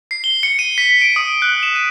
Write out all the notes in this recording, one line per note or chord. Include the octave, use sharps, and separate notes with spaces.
C7
G7
C#7
D#7
B6
D7
D#6
F#6
E7
D#7